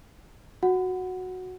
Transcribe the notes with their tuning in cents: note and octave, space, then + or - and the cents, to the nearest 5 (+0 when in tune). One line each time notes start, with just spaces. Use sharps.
F#4 -10 F#5 +0